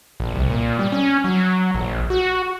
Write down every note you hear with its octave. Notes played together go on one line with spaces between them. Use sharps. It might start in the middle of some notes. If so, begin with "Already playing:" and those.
A#1
C2
A#2
G3
C#4
F#3
A#1
F#4